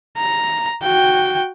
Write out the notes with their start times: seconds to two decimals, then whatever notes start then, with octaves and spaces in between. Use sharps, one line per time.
0.17 A#5
0.83 F#4 G5